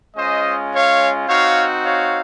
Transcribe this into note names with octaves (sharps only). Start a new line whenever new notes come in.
G#3 C#4 F4 C5 D#5
C#5 F5
C4 D#4 F#4 C#5 F5
C#5 F5